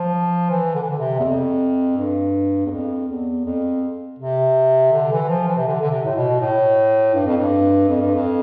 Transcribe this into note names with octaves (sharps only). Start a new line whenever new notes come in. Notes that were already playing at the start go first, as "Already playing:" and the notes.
Already playing: F3
E3
D3
E3
D3
C3
E2
F2
G2
E2
F2
E2
F2
C3
D3
E3
F3
E3
C3
D3
D3
C3
A2
B2
A2
G2
F2
G2
F2
G2
F2